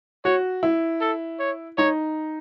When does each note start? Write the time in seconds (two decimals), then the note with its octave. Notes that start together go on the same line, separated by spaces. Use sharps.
0.25 F#4 C#5
0.63 E4
1.01 A4
1.39 C#5
1.78 D#4 C#5